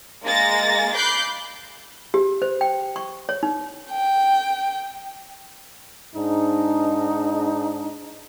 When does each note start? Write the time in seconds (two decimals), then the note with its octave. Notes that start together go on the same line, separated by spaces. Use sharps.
0.25 G#3 A#3 A6 A#6
0.95 B5 D6 F#6 G6 C7
2.14 G4
2.42 C5
2.61 G5
2.96 C#6
3.29 C#5
3.43 D#4
3.91 G5
6.15 G#2 D4 D#4